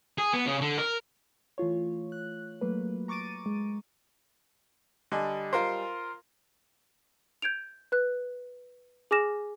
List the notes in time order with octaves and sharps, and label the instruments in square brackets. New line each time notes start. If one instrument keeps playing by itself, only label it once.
[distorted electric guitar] G#4
B3
C#3
D3
A#4
[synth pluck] E3 A3 F4 C#5
F#6
F#3 A3 A#3 B4
A#5 C#6 D6 A6 D7 D#7
G#3
[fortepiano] D3 [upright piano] G3 D#5 G#5
[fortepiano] F4 A#4 C5
[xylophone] G6 G#6 D7 F7
B4 F#6
G#4 G#5 D6 F6 A#6 E7